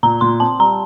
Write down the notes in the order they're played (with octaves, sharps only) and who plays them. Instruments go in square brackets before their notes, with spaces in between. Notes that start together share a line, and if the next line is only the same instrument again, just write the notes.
[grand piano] A#2 [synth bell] A#5
[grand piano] A#2 [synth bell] C6
[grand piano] C4 [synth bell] A5
[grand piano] G3 [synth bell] A#5